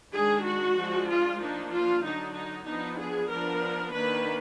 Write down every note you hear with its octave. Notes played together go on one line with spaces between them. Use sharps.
D#3 G#3 D4 G#4
F#4
F3 G#3 D4
F4
F3 A#3 D4 D#4
F4
D3 F#3 D4 D#4
D#4
F3 B3 D4 D#4
G#4
F3 B3 D4 A#4
D#3 A#3 D4 B4